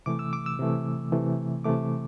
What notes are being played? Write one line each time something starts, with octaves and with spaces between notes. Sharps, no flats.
C3 E3 A3 D6
E6
D6
E6
C3 E3 A3
C3 E3 A3
C3 E3 A3 D6